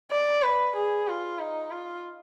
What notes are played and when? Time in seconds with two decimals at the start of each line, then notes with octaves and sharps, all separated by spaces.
0.12 D5
0.43 B4
0.76 G#4
1.08 F4
1.39 D#4
1.71 F4